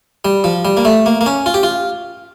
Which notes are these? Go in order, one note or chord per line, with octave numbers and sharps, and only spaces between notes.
G3
F3
G3
A#3
A3
A#3
A#3
C#4
F4
G4
F4